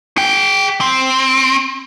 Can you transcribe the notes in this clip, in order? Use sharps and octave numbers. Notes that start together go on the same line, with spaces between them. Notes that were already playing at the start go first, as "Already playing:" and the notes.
G#4 G5
C4